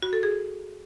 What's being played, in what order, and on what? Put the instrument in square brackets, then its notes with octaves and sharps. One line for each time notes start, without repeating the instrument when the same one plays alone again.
[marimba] F#4
A4
G#4